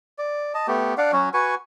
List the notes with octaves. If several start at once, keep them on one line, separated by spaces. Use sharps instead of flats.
D5
D#5 A5
A3 B3 G4
D4 D5 F5 F#5
F#3 C#4 F#4
F#4 B4 G#5 C#6